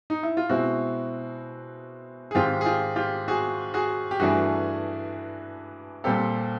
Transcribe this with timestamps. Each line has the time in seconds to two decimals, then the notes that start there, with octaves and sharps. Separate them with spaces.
0.10 D#4
0.23 E4
0.37 F4
0.49 B2 G#3 C4 E4 F#4
2.31 G#4
2.35 G#2 D#3 G#3 C4 F4 G4
2.61 G#4
2.66 F4 G4
2.96 F4 G4
3.28 F#4 G#4
3.74 F#4 G#4
4.11 G4
4.20 G2 E3 A3 D4 F#4 G#4
6.04 A#2 G3 C4 G4 A4